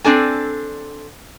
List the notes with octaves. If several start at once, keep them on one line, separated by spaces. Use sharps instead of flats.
C4 D4 A4 G#5